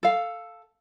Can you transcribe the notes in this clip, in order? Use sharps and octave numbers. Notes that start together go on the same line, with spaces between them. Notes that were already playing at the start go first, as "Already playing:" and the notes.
A4 F5